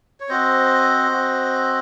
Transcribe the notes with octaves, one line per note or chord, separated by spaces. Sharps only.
C#5
C4 F#4 C5 D#5
C4 F#4